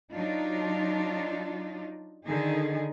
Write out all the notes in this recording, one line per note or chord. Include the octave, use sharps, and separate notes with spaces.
F#3 D4 D#4 F4
D3 D#3 D#4 G#4